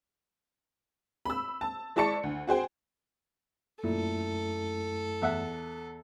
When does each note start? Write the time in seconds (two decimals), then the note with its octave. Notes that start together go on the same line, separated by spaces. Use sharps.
1.25 B5 E6
1.61 A5
1.96 G#3 E4 D5 A5 C#6 C#7
2.23 D2
2.47 F#4 G#4 C5 G5
3.83 F#2 A#2 A3 E4 A4
5.22 E2 E5 F#5